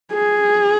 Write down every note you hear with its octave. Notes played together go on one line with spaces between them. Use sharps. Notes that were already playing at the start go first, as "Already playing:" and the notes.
G#4